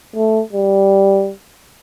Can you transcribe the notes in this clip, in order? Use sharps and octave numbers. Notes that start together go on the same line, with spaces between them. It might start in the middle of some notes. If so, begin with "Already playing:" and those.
A3
G3